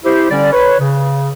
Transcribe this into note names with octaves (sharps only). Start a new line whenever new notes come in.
E4 G4 C5
D3 G3 C#4 D5
B4 C#5
C#3